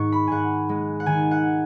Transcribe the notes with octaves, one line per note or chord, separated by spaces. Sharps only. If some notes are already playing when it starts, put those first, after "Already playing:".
Already playing: G#2 D#3 C#6
B5
G#2 F#5 G#5
G#3
F#5
D#3 G#5
F#5